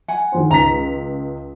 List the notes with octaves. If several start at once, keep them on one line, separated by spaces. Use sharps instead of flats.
F#5 G#5
D#3 F3 C5
C#2 A#5 B6